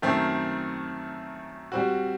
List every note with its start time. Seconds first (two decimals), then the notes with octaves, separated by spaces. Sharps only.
0.02 F#2 D#3 A3 C4
1.72 G3 C4 F#4